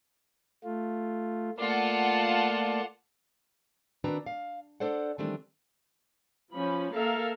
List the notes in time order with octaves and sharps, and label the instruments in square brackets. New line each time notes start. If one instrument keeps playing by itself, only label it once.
[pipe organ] A3 F4
[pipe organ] A3 A#3 D5 [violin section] F4 F#5 A5
[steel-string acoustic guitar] D#3 C4 D4 F#4 B4 A#5
F5
D4 A4 C5 D5 F#5
D#3 E3 G3 A3 C4 D4
[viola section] F3 C#4 B5
A#3 A4 A#4 E5 F5